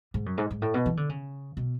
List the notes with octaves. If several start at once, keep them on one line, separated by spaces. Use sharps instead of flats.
G#2
F#2
G#2
G#2
A2
B2
E3
D3
C#3
B2